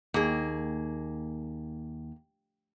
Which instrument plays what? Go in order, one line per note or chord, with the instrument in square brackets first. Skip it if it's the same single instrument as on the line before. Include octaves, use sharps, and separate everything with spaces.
[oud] D#2 [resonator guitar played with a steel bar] A#3 G#4